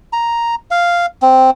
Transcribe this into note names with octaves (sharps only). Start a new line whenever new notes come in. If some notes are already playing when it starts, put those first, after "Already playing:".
A#5
F5
C4